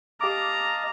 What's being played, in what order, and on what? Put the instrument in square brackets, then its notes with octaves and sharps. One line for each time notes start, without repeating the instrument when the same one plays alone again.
[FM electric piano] G4 D6 [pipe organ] D#5 F5 A5 [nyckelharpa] A#5